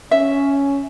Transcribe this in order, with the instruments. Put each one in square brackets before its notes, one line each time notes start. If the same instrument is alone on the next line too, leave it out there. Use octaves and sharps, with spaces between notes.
[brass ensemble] C#4 [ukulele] E5